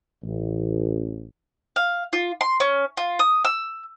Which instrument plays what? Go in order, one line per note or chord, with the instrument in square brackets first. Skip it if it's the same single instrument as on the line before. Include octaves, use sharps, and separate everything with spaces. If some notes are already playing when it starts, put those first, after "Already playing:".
[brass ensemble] A1
[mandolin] F5
F4
C6
C#4
F4
D#6
E6